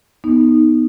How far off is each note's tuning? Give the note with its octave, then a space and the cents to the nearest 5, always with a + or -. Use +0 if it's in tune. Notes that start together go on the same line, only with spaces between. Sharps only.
B3 +0 D#4 +0